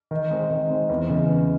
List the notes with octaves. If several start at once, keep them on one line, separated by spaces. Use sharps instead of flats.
D#3
G#3 C4 D#4
D#3
G#3 C4 D#4
E2
C#3 E3 G#3
E2